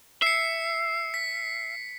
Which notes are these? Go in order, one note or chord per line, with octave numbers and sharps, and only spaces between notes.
E5 C7 C#7
B6